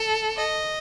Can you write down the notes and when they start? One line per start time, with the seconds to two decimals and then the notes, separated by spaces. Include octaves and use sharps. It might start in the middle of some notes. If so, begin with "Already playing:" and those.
Already playing: A4
0.36 D#5